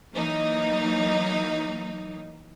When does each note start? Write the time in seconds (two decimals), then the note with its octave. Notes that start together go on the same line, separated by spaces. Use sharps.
0.14 E3 F#3 A#3 D#4